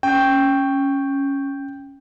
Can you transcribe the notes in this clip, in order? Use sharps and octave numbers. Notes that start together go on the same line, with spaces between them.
C#4 G5